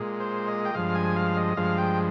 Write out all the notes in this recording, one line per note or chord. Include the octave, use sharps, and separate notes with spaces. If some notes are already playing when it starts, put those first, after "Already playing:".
Already playing: A#2 G#3
C5
D#5
G5
G2 F3 G#3 F5
G#5
F5
D#5
G2 F3 G#3 F5
G5